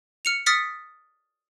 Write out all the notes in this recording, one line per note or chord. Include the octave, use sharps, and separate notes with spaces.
F6 C#7 F7
D#6 F6 A6 B6 C#7